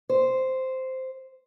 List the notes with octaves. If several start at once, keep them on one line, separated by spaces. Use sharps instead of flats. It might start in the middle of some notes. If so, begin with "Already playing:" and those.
C5